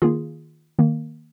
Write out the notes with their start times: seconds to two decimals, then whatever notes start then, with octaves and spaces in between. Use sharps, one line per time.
0.02 D#3 A#3 F4 G#4
0.79 D#3 A#3